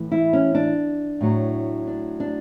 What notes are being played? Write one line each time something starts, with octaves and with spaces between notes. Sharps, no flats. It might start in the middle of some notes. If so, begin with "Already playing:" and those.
Already playing: A2 E3
E4
C#4
D4
A2 F#3
D4
D4